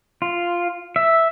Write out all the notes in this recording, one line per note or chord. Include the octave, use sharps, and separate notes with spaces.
F4
E5